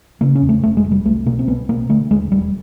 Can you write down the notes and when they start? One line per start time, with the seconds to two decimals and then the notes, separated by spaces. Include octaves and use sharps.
0.21 C#3 A#3
0.35 C#4
0.42 E2
0.49 A3
0.63 F1 A3
0.77 G#3
0.84 F1
0.91 G3
1.05 C2 A3
1.26 B2 A#3
1.39 C4
1.47 C2 B3
1.69 B2 A#3
1.89 D3 A3
2.11 D#2 G#3
2.32 E1 G3